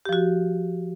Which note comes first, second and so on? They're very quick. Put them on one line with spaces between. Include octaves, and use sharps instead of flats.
G4 F3 F#4